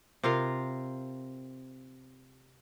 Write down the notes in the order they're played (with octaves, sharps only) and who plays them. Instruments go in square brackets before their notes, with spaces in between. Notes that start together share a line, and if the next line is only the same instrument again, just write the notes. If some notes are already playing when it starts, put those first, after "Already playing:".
[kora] C3 F4 A#4 F5